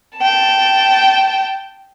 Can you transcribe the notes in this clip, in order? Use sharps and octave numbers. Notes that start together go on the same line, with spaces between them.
G5 A5